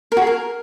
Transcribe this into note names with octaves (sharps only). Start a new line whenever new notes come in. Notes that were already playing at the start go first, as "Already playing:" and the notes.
A#4
F#4
G#4
A#4